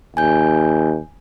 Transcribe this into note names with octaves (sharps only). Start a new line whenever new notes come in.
D#2 G#5 G6